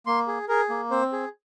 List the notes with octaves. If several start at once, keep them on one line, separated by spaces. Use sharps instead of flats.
A#3 C6
G#4
G#4 A#4
A#3
C4 C5
G#4